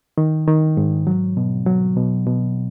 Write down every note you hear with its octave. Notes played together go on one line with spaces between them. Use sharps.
D#3
D#3
G#2
F#3
B2
F#3
B2
B2